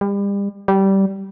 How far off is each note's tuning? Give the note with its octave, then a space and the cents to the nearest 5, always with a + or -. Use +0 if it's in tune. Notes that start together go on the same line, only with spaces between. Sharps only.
G3 +35
G3 -15